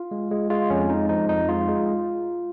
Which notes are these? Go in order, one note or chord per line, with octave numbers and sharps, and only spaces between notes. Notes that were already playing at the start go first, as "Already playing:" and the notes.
Already playing: F4
G#3
G#3
G#3 F4
F2 C#4
G#3 D#4
F3 D#4
F2 D#4
G#3 F4
G#3